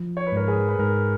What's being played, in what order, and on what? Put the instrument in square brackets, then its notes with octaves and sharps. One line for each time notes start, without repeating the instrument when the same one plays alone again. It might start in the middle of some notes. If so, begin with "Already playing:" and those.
Already playing: [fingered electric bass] F3
[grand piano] C#5
B4
[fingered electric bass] G#2 [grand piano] A#4 C#5
[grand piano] G#4 B4
B4
[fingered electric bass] G#2 [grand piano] A#4